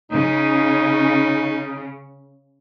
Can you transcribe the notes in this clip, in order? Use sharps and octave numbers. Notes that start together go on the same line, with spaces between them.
C#3 D#4